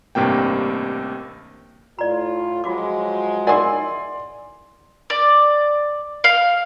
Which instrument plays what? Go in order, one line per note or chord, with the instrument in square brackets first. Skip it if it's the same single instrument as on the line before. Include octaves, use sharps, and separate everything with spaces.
[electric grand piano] A1 G2 C3 A#3 G5
[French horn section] A2 F4 [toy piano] D5 A#5
[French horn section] F3 F#3 G#3 [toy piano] F4 F#4 D6
[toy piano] E4 A#4 F#5 [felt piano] D5 C6 [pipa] E5 G#5
[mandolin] D5
F5